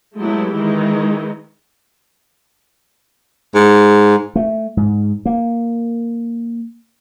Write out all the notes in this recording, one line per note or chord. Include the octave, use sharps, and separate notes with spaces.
F#3 G#3 A3 B3 E4 G4
D#3 E3 G#3 D#4 E4
G#2
A3
G#2
A#3